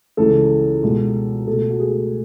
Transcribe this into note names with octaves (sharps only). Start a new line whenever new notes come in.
C#2 C#3 E3 A4
C#2 B2 G#3
B2 A3 A4
F#4
G#4